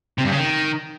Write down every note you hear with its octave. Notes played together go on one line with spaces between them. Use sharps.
C3
G2
C#3
D#3